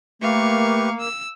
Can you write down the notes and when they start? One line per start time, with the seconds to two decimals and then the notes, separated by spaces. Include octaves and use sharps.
0.22 A3 A#3 G4 B4 F5 C#6
1.00 E6